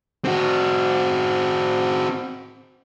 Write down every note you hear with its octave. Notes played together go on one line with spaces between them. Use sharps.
C4 F#4